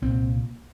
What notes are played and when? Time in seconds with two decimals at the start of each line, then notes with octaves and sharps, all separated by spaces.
0.02 C2 A#2 C4